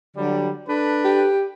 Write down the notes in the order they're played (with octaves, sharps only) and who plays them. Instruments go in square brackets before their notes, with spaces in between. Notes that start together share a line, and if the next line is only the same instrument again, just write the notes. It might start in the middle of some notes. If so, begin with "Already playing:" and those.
[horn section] D3 F#3 G3
D4 A4 B4
[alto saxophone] G4